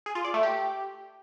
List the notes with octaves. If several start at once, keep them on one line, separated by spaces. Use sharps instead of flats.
G#4
F4
D5
A3
G4